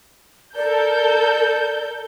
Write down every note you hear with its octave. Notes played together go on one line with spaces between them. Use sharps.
A4 A#4 D5 G6